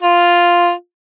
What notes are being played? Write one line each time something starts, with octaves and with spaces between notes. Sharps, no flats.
F4